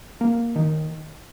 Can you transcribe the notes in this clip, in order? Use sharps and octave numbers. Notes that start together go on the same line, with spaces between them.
A#3
D#3